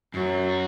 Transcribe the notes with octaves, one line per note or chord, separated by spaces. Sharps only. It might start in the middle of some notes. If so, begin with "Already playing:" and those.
F#2 F#3
F#4